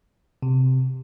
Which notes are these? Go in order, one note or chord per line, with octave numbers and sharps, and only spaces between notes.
C3